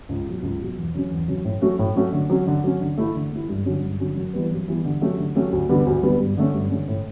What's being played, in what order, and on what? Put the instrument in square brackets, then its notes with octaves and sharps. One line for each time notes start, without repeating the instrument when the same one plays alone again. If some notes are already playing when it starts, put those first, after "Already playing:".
[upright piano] C#2
B2 F#3
C#2
B2 F#3
E2
C#3 F#3 C#4
E2
C#3 F#3 C#4
A2
F#3 A3 C#4 F#4
A2
F#3 A3 C#4 F#4
D3
F#3 C#4
D3
F#3 C#4
D3
A3 E4
D3
A3 E4
G2
D3 F#3 C#4 F#4
G2
D3 F#3 C#4 F#4
F#2
E3 G3 B3
F#2
E3 G3 B3
D3
F#3 A3 C#4 G4
D3
F#3 A3 C#4 G4
D2
D3 G3 B3
D2
D3 G3 B3
G2
D3 A3 C#4
G2
D3 A3 C#4
A2